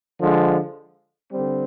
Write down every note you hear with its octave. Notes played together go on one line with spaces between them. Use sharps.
D3 F3 G#3
D3 G3 C4